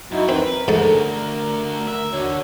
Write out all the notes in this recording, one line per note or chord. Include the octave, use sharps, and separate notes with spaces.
F#2 D#4 E4 F#4
C4 A#4 B4
D2 G#2 A4
E5
D3 F#4 C#5